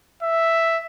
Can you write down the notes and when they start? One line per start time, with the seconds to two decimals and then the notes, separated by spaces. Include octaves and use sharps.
0.23 E5